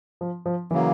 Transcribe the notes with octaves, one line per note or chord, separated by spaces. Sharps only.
F3
F3
C#3 E3 F#3 A#3